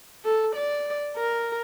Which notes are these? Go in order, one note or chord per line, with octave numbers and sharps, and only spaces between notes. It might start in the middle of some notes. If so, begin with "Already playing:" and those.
A4
D5
A#4